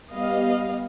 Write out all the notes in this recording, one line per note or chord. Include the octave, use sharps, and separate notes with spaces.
G3 B3 D#5 F5